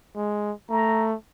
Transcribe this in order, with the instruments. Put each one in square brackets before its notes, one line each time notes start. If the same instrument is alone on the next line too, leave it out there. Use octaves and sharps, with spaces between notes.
[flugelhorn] G#3
[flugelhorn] A3 [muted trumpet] A#5